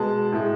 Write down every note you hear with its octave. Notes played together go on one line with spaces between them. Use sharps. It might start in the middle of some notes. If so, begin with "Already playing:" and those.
Already playing: B2 G#3 A5
A2 G#3